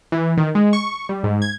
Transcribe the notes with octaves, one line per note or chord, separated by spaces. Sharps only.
E3
D#3
G#3
C#6
G3
G#2
G#6